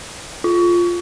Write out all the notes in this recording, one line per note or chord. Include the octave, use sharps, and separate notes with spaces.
F4